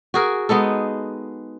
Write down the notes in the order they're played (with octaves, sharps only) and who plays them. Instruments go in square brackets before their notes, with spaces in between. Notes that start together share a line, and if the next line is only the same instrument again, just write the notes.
[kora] F#4 G#4 A#4
G#3 B3 D#4 A4